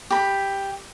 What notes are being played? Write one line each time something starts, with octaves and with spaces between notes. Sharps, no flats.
G4 B5